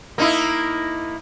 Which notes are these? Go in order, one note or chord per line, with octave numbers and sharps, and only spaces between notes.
A#3 D#4 E4